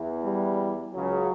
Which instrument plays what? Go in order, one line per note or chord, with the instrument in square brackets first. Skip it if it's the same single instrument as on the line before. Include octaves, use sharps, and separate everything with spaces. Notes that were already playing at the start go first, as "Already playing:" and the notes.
Already playing: [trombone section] E2 E3
[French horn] G3
[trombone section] C#2 C#3 [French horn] F#3